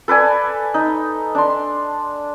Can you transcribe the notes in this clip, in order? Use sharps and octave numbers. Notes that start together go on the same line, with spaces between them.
A4 B4 D5 G#5
D#4
D4 C6